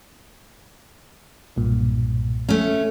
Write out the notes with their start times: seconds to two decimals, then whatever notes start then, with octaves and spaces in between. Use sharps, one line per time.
1.56 B1 G2 A#2
2.49 A3 C#4